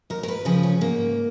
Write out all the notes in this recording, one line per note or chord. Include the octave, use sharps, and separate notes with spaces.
D#2 A#4
A#4
B4
C#3 F3 G#4
C#4
G#2 A#3